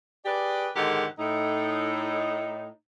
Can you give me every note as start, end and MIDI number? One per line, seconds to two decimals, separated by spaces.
0.25 0.67 67
0.25 0.67 68
0.25 0.67 71
0.25 0.67 74
0.75 1.05 44
0.75 1.05 50
0.75 1.05 51
0.75 1.05 67
0.75 1.05 70
0.75 1.05 78
1.18 2.68 45
1.18 2.68 63